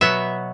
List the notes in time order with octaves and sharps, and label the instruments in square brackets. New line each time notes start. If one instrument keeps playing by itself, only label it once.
[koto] B2 F#3 B3 E5